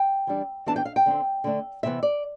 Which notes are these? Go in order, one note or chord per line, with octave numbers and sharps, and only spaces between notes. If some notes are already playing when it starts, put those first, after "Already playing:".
Already playing: G5
E3 G3 D4
E3 B3 D4 A5
G5
F5
G5
D3 A3 C4
D3 A3 D4
C3 E3 B3 E5
D5